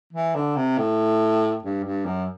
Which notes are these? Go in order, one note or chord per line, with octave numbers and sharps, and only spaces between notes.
E3
D3
C3
A2
G2
G2
F#2